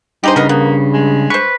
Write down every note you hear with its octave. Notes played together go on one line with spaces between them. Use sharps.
G2 D#4 G4 G#4 C5
C#3 G#3 B3 A#4
A#3 B3
G#3
B4 C5 C#6